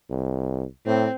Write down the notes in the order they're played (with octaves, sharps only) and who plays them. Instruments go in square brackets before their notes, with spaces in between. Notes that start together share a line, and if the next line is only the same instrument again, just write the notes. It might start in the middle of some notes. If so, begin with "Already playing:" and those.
[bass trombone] C2
[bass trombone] A2 [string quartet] C4